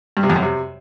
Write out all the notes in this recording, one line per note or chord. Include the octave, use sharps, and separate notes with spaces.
G2
C3
F2
F#2
C3